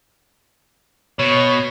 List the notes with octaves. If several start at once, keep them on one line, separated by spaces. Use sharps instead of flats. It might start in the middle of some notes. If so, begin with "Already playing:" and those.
B2 C#5